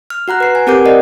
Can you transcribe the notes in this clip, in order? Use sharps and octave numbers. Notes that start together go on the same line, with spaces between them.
F6
F#4 F#5 A#5 F#6
B4 C7
G#5
C4 G4 A#4 F#5 D6 G6
A#4 D5 D#5 F#5